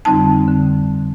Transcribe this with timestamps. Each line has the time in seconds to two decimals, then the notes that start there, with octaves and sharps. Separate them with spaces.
0.05 F2 D3 G3 C4 D#4 A5
0.48 D3